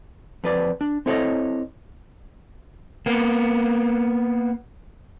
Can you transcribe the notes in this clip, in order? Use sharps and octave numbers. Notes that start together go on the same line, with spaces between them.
F2 B4 D5
D4
C4 E4 A4 B4 C#5 D#5
A#3 B3